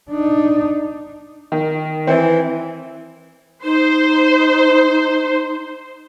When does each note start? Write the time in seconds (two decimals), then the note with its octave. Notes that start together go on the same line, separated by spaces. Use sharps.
0.11 D4 D#4
1.52 D#3
2.07 E3 C4
3.64 D#4 C5